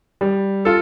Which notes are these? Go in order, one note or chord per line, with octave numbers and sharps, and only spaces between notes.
G3
F4 A4